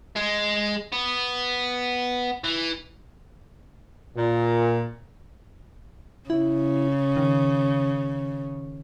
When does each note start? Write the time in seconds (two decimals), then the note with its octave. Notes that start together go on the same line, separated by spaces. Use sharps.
0.16 G#3
0.93 B3
2.44 E3
4.17 A#2
6.30 C#3 E4
7.17 D#3